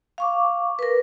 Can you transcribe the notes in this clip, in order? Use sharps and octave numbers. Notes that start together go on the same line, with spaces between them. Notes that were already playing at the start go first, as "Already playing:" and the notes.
F5 C#6 D6
A#4 B4